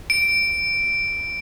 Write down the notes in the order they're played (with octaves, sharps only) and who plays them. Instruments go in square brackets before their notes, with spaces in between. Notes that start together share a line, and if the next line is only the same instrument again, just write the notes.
[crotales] D7